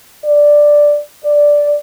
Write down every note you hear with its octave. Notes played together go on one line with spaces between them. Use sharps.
D5
D5